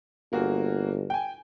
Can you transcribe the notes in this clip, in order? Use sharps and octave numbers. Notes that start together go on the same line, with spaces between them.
G1 A#3 F#4 G#4
G5 G#5